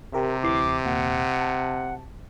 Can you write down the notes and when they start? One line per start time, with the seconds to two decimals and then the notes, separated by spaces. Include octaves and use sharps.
0.13 C3 G4 A#4 E5
0.43 D2 E3 D6 C7
0.85 D#2 A#2 F#5
1.41 A5